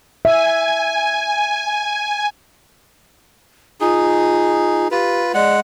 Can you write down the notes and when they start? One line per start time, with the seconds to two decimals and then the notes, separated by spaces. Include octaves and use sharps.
0.25 E5 G#5
3.81 D#4 F4 G#4
4.91 F4 G4 B4
5.34 G#3 D5 F#5